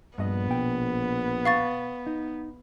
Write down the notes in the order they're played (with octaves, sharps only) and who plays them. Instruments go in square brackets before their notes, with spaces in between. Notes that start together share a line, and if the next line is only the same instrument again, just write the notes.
[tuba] A#1 [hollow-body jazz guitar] G2 D#5 [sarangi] B3
[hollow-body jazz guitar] B2 G5
[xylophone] F5 C#6 A6
[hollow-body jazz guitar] D#4